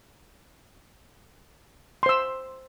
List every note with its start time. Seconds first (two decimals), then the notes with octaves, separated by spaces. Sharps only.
2.03 C6
2.06 C5
2.09 E6